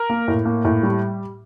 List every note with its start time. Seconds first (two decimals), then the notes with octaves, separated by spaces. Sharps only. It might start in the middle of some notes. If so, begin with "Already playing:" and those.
Already playing: A#4
0.10 A#3
0.28 A2
0.45 A#3
0.65 A2
0.83 G3